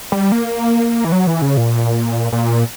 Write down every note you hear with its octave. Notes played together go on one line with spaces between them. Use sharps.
G3
A#3
E3
F#3
E3
C#3
A#2
A#2